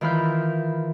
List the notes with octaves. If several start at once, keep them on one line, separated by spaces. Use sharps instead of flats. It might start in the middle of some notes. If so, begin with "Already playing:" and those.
D#3 E3 F4 B5 F6 G6